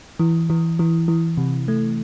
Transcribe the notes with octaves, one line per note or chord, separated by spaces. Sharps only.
E3
E3
E3
E3
C3
A3